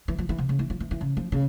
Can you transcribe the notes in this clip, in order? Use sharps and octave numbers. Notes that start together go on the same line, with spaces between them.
E3
F3
E3
C3
C#3
E3
F3
E3
E3
C#3
F3
C#3